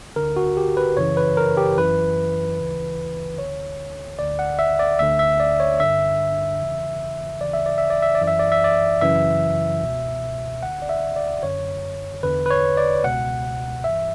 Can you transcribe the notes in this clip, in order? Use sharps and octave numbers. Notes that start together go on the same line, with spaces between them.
D2 D3 A#4
F#4
G4
B4
F#2 C#3 E3 C#5
B4
A#4
G4
F#2 E3 B4
D2 C#3 E3
D2 D3 C#5
D2 D3 D5
F#5
E5
D5
D2 D3 E5
E5
D5
C#5
G2 D3 E5
E2 C#3 E3
D2 C#3 E3 D5
E5
D5
E5
D5
E5
D5
F#2 E3
E5
D5
E5
D5
F#2 C#3 E3 E5
C#2 B2
D2 D3 F#5
D5
E5
D5
F#2 D3 C#5
E2 D3 B4
B4
C#5
D5
C#2 B2 F#5
G2 E3 E5